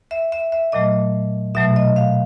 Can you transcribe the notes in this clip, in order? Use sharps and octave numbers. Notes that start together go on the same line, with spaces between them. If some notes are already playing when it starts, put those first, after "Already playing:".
E5
E5
E5
A#2 F#3 A3 D#5
B2 F#3 A3 E5
D#5
F5